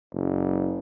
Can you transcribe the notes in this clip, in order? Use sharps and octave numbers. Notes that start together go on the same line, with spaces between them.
F#1